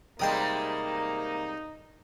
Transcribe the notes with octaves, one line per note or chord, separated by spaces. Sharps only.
C3 G3 G#3 A#3 D#4 C5 G5 D#6